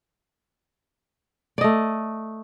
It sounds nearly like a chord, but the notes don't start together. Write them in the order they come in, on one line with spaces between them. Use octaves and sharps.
D5 D#5 A3